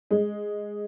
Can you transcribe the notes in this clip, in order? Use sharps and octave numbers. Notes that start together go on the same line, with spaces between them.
G#3